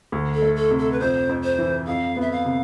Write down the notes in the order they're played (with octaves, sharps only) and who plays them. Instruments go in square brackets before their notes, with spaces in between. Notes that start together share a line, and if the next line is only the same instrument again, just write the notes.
[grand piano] D2
[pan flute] A4
[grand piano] A3
[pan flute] A4
[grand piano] C3
[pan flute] A4
B4
[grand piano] F2 [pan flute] C5
[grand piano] F2
[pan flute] C5
[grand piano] E3
[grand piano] F2 [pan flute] F5
[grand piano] B3 [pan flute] E5
[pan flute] F5
[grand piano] C3